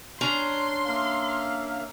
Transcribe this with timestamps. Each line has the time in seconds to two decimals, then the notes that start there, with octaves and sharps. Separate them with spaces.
0.21 C#4 D4 A#5 C6
0.87 A#3 E5 F5